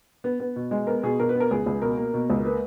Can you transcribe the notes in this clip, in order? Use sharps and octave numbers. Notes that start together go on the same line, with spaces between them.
B3
B3
B2
G#3
B3 A#4
B2 G#4
B2 A#4
B4
B3
A#4
C#2 G#4
C#2
B2 A#4
A#3
B2
C#2
A#3 B4